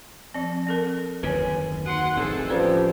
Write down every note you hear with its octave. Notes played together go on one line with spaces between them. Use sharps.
F3 C4
C4 A4 A#4
F#1 D#2 D3 B4 C#5 G#5
D#4 F#4 F#5 C6
D1 A1 C4 G#4 A4
F3 C#4 G4 B4 D5